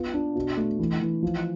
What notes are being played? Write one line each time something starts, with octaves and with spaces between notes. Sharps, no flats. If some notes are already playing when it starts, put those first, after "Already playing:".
Already playing: B3 F4
D4
B2
A3
E3
E3
F3